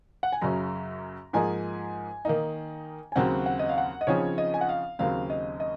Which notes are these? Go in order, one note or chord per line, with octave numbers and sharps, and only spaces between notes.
F#5
G#5
F#2 C#3 F#3 C#4 A#5
G#2 F3 A#3 D#4 G#4 G#5
D#3 A#3 D#4
G#5
D#2 C#3 F#3 C4 F#5
F#5
D#5
F5
F#5
D#5
C#3 F3 C4 D#4 G#4 C#5
D#5
G#5
F#5
F5
D#2 C#3 F#3 C4 F5
D#5
D#5